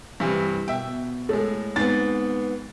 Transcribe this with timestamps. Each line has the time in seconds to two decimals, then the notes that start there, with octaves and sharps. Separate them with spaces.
0.20 G2 C3 E3
0.68 B2 E5 G5
1.29 A2 G#3 A4
1.76 G#2 B3 C4 A6